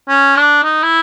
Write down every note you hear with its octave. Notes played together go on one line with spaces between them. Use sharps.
C#4
D4
D#4
E4